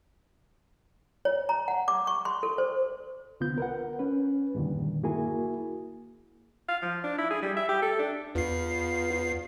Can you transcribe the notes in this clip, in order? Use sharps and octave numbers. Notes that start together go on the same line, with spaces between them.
C#5
A#5
F#5
D6
C#6
C6
A4
C5
C2 D3 B3 F4 G6
A#4 B4 F#5
C#4 B4
E2 G2 A#2 D3 D#3
A#3 E4 F#4 G#4 A#4 G#5
F5
F3
D4
E4
G#4
G3
E5
G4
A4
D4
E2 F4 B4 C7